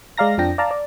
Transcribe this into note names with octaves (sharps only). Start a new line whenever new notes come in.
G#3 D5 F5 A#5 A#6
F2 F3 D4 G5 A#6
D5 F5 A5 A#5
D5